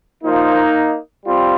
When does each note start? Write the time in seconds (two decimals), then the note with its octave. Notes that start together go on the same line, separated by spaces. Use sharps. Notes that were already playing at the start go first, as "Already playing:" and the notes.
0.23 A#2 F3 A#3 D#4
1.26 G3 C4 F4